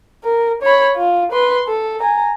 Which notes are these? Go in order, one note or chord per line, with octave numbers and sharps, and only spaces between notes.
A#4
C#5 B5
F4
B4 C6
A4
G#5 A#5